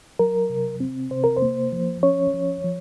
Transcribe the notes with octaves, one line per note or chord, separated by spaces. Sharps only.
F#3 A#4
C3
C4
C3 C5
A#4
C5
A#3
F3
C#4 C#5
F3
F3